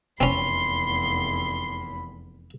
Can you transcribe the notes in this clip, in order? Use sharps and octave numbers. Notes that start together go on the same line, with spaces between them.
F1 E2 C4 C#4 B5 C6